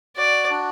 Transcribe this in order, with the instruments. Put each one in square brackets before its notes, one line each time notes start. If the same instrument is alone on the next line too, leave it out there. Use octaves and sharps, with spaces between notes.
[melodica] F#4 [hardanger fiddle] D5
[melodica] D4